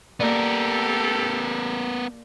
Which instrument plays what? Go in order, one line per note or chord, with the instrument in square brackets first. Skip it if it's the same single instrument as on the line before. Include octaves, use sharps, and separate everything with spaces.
[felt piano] A#3 D5 [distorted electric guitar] B3 A#4 [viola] G4 A4